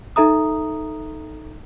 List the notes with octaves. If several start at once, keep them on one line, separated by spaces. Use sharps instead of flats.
D#4 A4 E5 A#5 D#6